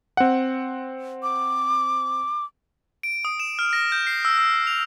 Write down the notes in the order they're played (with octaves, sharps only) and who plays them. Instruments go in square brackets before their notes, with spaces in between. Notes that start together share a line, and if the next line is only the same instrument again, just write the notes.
[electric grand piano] C4 F#5
[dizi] D6
[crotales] D7
D#6
E7
F6
A#6
G6
C7
E6
E6
F7